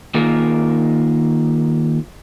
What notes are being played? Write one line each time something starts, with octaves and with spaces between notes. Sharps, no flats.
D#3 A#3 F4 G#4 A#4